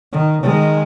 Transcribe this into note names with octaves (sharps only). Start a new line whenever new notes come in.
D#3
D#3 G#3